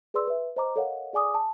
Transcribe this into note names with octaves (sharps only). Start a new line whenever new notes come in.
G#4 B4 D5 C6 E6
B4 E5
C5 D#5 A#5 D6
A4 A#4 C#5 D#5 F5 F#5
G#4 D5 G#5 D6 D#6
A5